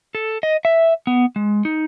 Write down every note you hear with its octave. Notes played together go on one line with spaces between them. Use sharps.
A4
D#5
E5
B3
G#3
D#4